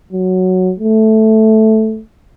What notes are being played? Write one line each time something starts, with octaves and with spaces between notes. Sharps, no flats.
F#3
A3